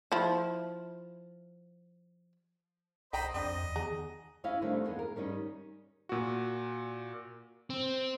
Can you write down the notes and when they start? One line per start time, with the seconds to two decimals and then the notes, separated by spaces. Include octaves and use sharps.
0.12 F3 E4
3.13 B1 C5 D#5 F5 G5 A#5 B5
3.34 F2 C4 D4 D#5
3.63 E2
3.76 D#3 B3 G#4 A#5
4.44 C#4 E4 D#5 F5
4.62 D3 D#3 G3 A3 C4 D4
4.84 E2 G#3 A#3 B3
4.99 A#4
5.16 D#3 G3 C#4 D#4
6.09 A#2 F#4
7.70 C4